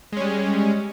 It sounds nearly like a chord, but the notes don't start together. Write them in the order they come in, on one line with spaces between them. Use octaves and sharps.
G#3 C#4 G3